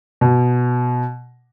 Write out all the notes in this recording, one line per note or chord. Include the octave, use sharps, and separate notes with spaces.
B2